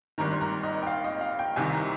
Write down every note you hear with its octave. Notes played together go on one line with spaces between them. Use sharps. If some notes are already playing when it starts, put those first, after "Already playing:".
G#1 G2 D#3 A#5
C6
A#5
D#5
G5
F5
D#5
F5
G5
C2 C3 D#3 G#5
A#5